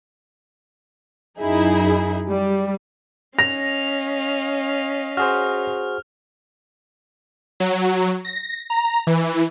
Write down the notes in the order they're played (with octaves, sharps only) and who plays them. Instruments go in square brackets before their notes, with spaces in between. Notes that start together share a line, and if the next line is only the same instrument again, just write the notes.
[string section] F#2 D#4 E4 G#4
G3
[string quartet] C#4 D#5 F5 [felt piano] A#6 [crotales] F7
[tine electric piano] F#4 G#4 C5 [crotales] F6
[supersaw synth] F#3
A#6
A#5
E3